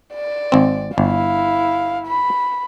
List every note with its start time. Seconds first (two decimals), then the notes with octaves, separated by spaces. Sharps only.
0.14 D5
0.52 G#1 C4
0.98 G1 E4 F5
2.07 B5